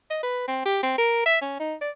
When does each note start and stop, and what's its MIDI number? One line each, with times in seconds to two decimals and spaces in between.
0.10 0.18 75
0.23 0.44 71
0.48 0.62 60
0.65 0.81 67
0.83 0.94 60
0.98 1.21 70
1.26 1.39 76
1.41 1.56 61
1.59 1.75 63
1.81 1.90 74